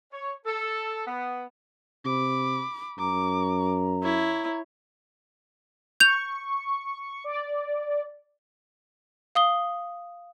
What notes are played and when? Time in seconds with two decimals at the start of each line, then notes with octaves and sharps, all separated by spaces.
0.12 C#5
0.45 A4
1.07 B3
2.05 C3 B5 D6
2.99 F#2 A#5 D6
4.03 E4 C#5
6.00 C#6 G6 F7
7.24 D5
9.35 F5 D#6 G7